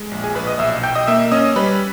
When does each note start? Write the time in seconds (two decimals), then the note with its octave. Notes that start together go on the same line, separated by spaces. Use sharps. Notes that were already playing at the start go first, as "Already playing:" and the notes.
Already playing: G#3
0.11 A#1
0.24 G#4 G#5
0.35 A#1 B4 B5
0.47 D#5 D#6
0.59 B1 E5 E6
0.83 B1 G5 G6
0.95 D#5 D#6
1.07 A#3 E5 E6
1.31 C#4 D#5 D#6
1.56 G3 B4 B5